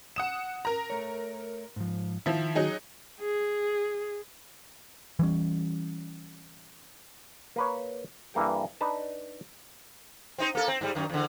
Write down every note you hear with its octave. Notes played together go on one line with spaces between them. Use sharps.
F#5 D#6 E7
A#4 A#5
A3 C#5
G#2 F3
D#3 F3 E4
F#3 D#4 G#4
G#4
E3 G3 C#4
A#3 B4 C#5
G2 E3 A#3 A4 G5
D4 D#4 B4 A5
C4 D#4 C5
A#3 A4
C4
G#2 G3
F#2 D#3
E2 D3